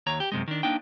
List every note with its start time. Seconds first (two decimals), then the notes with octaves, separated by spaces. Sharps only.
0.07 D#2 C#5 A#5
0.20 G4
0.32 F#2 C3 G#3
0.48 D#3 D4
0.63 A#3 D4 D#4 G5